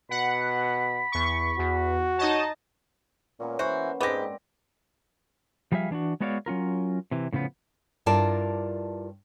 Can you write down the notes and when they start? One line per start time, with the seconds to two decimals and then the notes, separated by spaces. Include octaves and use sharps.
0.11 B2 F#5 B5
1.12 E2 C#6
1.59 E2 F#4
2.19 D#4 C#5 D#5 A5
3.40 A#2 A#3 B3 C#4
3.59 E3 F#4 C5
4.01 G#2 G#3 B3 C4 D4 G4 D6 A#6
5.72 F3 G3 G#4 B4 E5 F5
5.91 E3 D4 F4 F#4
6.20 G#3 B3 F#4 C#5 D5 F5
6.46 F#3 C#4 F4 A#4
7.11 C3 E3
7.33 A2 C#3 F3 B3
8.06 G2 E4 F4 A#4 D5 A5